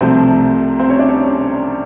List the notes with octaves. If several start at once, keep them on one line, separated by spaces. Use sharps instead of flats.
C2 C3 F3 A3 C4 C5
C4 C5
C#4 C#5
D4 D5
C#4 C#5